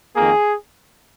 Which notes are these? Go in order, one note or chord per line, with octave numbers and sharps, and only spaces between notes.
F2 D#3 A#3 G#4